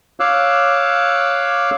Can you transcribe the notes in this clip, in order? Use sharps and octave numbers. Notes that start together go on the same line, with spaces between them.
C#5 F5 D6 E6 F#6